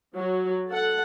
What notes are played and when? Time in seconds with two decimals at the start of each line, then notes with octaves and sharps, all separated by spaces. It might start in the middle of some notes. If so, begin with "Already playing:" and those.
0.16 F#3
0.69 A4 F#5